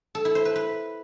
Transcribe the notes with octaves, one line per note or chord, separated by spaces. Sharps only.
A4
E4
C5
B4
B4